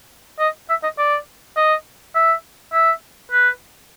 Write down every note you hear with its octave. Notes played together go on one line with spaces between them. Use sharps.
D#5
E5
D#5
D5
D#5
E5
E5
B4